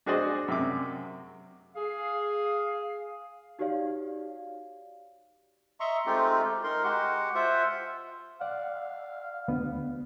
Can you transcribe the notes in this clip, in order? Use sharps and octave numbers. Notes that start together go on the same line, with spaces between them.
D4 F#4 G#4 C5 D5 D#5
F#2 C3 D6
G#4 F5
D#4 F#4 G4 C#5 D5 F5
D#5 E5 A#5 C6 C#6
G#3 A3 C4 D#4 F4 G4
D#4 A#4 C6
G#3 F#4 G4 F#5
F4 C5 E5 F#5
D5 F5 F#5
D2 B3